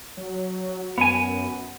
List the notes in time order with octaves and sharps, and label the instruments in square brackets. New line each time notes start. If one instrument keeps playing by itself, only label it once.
[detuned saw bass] F#3
[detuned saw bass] F#2 [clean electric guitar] B3 G#5